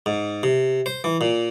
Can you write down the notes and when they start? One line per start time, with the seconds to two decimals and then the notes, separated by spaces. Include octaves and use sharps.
0.06 G#2
0.43 C3
0.86 C5
1.04 E3
1.21 A#2